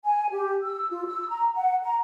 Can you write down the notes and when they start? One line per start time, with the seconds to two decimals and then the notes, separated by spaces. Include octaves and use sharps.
0.05 G#5
0.31 G4
0.63 E6
0.90 F4
1.06 E6
1.29 A#5
1.54 F#5
1.83 A#5